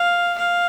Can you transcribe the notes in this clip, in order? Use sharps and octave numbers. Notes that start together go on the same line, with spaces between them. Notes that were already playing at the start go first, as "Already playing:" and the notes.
Already playing: F5
F5